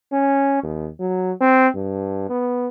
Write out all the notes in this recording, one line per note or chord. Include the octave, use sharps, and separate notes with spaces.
C#4
D#2
F#3
C4
G2
B3